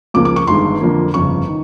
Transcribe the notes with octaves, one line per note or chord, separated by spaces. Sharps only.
C#2 C#3 F3 A#3 D6
D6
C#6
G1 G2 D#3 G#3 C6
F2 D3 F3 A#3
G1 F2 C#3 C#6
D#3